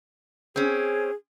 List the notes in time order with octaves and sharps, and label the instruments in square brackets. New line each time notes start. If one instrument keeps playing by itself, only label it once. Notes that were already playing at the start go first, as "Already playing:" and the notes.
[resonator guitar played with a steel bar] C4 C#4 [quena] G#4